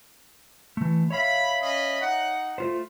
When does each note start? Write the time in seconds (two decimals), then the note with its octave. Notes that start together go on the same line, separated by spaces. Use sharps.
0.77 E3 A3
1.10 C#5 E5 F5 B5
1.61 C#4 D#5 B5
2.00 D#4 F#5
2.58 A3 F4 C5